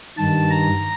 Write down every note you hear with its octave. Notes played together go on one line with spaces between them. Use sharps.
G2 D#3 A5
A#5